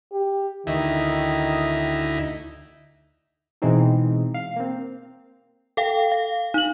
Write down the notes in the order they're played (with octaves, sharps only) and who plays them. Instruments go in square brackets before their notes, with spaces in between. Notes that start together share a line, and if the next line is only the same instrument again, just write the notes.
[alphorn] G4
[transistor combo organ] D2 D#4 E4 [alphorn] D#3
[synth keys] B2 E3 G#3 C4 D#4
F5
A#3 C4
[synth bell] A4 F5 G5
F5
D#4 F#7